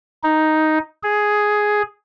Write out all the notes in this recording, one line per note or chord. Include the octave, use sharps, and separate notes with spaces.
D#4
G#4